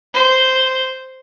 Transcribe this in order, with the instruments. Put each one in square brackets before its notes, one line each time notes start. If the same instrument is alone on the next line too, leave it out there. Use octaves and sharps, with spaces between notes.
[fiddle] C5